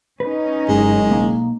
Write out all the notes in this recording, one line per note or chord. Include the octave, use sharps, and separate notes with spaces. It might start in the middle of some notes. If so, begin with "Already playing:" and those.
C#4 D#4 B4
F#1 G2 G#3
B1 A#3 A#5